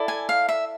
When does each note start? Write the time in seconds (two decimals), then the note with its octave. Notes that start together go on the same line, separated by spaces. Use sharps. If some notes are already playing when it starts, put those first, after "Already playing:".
Already playing: E4 A4 D5
0.08 G#5
0.29 F5
0.49 E5